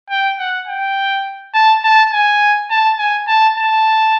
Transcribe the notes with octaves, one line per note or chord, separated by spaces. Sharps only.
G5
F#5
G5
A5
A5
G#5
A5
G#5
A5
A5